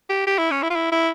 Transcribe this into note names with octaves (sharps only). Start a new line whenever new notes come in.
G4
G4
E4
C#4
E4
F4
E4
E4